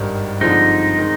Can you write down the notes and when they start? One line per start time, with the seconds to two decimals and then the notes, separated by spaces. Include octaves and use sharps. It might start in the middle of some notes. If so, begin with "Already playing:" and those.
Already playing: G#1 G2 D#3
0.41 G2 D3 F3 G#3 C4 D#4
0.98 D#3 G#3 C4